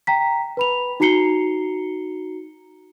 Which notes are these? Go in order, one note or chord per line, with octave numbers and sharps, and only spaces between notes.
G5 A#5 B6
B4 B5 F7
D#4 F#4 A#5 C7 C#7 G7